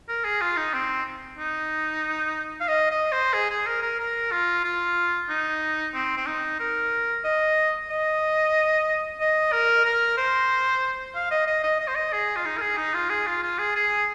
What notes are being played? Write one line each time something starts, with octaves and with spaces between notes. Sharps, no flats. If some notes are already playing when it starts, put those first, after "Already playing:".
A#4
G#4
F4
D#4
C4
D#4
F5
D#5
D#5
C5
G#4
G#4
A#4
A#4
A#4
F4
F4
D#4
C4
C4
D#4
A#4
D#5
D#5
D#5
A#4
A#4
C5
F5
D#5
D#5
D#5
D#5
C5
D#5
G#4
F4
D#4
A#4
G#4
D#4
F4
G#4
F4
F4
G#4
G#4